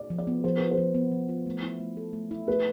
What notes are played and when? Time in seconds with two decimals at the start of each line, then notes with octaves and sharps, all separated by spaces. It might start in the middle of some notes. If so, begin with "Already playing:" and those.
Already playing: D5
0.10 F3
0.18 D5
0.27 B3
0.44 F3 C5
0.58 F4 B4
0.71 C5
0.78 F3
0.94 B3
1.12 F3
1.29 F4
1.46 A3
1.63 E4
1.80 A3
1.97 A4
2.13 A3
2.31 E4
2.47 A3 B4